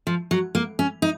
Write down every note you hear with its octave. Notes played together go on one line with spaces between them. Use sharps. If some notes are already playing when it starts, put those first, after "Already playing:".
F3
F#3
A#3
C#4
D#4